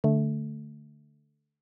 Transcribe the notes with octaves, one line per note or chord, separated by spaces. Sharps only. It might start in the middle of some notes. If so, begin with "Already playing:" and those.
D3 A3